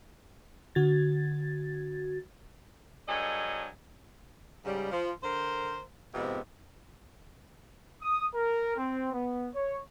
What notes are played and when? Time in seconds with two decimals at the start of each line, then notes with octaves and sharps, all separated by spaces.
0.75 D3 F#4 G#6 A6
3.08 G2 F#3 G#4 A4 C#5 D#5
4.65 G#2 C#3 G3
4.91 F3
5.23 D3 A#4 C5
6.14 F2 G#2 C3 B3
8.02 D#6
8.33 A#4
8.77 C4
9.13 B3
9.54 C#5